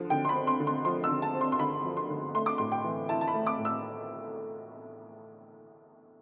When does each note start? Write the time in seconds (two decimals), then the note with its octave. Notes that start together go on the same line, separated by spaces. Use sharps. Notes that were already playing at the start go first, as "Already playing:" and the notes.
Already playing: D3 F3
0.10 D3 G5
0.25 C6
0.29 B5
0.35 C4
0.47 C6
0.60 D3
0.67 C6
0.85 F3 C6
1.04 E6
1.09 D3
1.22 A5
1.34 C4
1.41 C6
1.52 C6
1.59 D3 B5
1.84 F3
1.97 C6
2.09 D3
2.34 A3 C6
2.46 D6
2.58 A2 C6
2.72 G5
2.84 E3
3.09 E4 A5
3.21 A5
3.28 B5
3.34 A3
3.47 D6
3.59 A2
3.65 E6